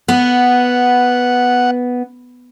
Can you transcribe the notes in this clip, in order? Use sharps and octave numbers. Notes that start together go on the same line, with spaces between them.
B3 F#5